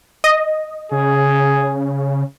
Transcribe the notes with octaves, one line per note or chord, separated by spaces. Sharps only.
D#5
C#3 G#4